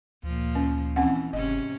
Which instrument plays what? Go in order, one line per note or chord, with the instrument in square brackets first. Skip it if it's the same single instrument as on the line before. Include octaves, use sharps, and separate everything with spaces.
[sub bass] D2 [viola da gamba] A#2 F3
[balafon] C#4
[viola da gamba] E3 [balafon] C4 C#4 F#5
[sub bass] F#1 [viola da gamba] G#2 C3 C#4 [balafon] D#5